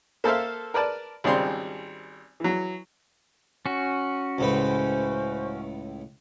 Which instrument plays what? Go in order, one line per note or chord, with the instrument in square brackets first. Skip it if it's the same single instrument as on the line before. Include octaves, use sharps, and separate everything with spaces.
[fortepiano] A#3 A4 C5 E5 F5
A#4 B4 D5 A5
G#1 C#3 G3 C4 C6
E3 F#3
[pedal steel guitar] C#4 F#4
[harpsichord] C#2 A2 B4 [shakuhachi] C5